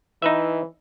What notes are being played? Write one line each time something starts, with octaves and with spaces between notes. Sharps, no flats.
E3 D#4 B4 E5